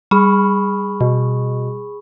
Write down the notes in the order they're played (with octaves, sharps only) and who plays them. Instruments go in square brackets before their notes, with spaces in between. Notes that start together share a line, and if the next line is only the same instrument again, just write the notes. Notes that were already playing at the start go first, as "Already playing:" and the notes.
[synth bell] G3 [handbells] G#4 B5 C#6
[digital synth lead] B2